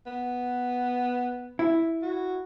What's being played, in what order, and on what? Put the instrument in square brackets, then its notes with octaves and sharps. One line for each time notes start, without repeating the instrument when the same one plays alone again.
[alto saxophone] B3
[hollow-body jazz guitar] E4
[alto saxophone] F#4